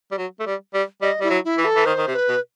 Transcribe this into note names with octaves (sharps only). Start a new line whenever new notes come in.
G3
F#3
A3
G3
G3
G3 D#5
G3 E4
F#3
E4
E3
A4
E3
D#3 C5
D#3
C3
B4
B2